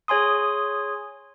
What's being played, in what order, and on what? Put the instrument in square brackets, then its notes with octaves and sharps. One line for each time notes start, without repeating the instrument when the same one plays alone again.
[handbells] G#4 C#5 G#5 C6 D#6